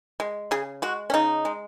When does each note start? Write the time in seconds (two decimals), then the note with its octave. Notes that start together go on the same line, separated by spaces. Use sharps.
0.20 G#3
0.51 C#3 G#4
0.82 G#3 F#4
1.10 C#4
1.14 C#3 D#4
1.45 G#3